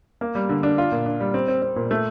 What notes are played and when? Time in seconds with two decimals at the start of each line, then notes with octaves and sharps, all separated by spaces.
0.21 A#3
0.35 G3
0.49 D3
0.63 D4
0.78 F4
0.92 A#2
1.06 D4
1.20 G3
1.34 C4
1.48 C4
1.62 C4
1.76 A#2
1.91 A3